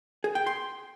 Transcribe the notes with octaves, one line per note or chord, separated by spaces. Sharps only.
G#4
G5
C6